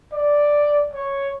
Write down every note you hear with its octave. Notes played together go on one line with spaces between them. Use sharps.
D5
C#5